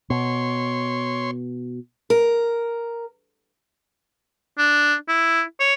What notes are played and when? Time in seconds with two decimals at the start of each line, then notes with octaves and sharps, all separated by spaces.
0.10 B2 C#5 C6
2.10 A#4
4.58 D4
5.09 E4
5.60 C#5